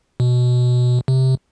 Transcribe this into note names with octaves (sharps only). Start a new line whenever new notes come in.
B2
C3